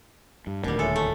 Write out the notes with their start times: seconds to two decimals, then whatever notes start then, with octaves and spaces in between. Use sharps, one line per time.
0.47 G2
0.64 D#1 D2 B2 D3 G3 A#4
0.79 G#3 A4 C#5 E5 G#5
0.96 A3